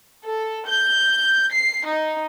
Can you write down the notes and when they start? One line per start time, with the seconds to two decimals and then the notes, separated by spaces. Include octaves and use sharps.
0.25 A4
0.68 G6
1.53 C7
1.87 D#4